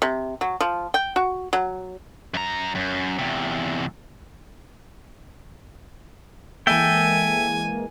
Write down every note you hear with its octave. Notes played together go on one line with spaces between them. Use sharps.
C3
F#3
F3
G5
F#4
F#3
F#2 A#5
F#2
E2 C3
E3 G#3 A#3 A4 E5 G5 G#5